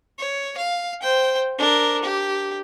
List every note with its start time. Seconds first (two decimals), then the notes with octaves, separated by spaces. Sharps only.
0.19 C#5
0.57 F5
1.02 C5 G5
1.58 D4 A#4
2.03 G4